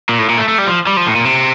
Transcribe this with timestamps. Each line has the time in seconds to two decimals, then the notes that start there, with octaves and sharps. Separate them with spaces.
0.09 A#2
0.19 A2
0.29 A#2
0.38 A3
0.48 A3
0.58 G3
0.67 F3
0.87 G3
0.97 F3
1.07 A2
1.15 A#2
1.25 C3